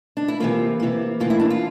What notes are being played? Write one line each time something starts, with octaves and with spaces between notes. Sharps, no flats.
D4
E4
C3 E3 A#3 F4
C3 E3 A#3
A2 E3 A#3 F4
E4
D4
F4